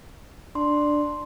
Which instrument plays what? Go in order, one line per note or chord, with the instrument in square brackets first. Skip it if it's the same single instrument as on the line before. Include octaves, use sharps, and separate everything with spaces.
[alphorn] D4 [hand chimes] C6